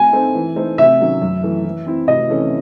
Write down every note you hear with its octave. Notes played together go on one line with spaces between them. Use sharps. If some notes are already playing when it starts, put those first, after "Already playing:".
Already playing: G#5
C4 D#4 A4 C5
E3
A3 D#4 A4 C5
C3 E5
D#3 F#3 C#4 F#4
F#2
E3 A3
E3
C4 E4
C3 D#5
E3 A3 C#4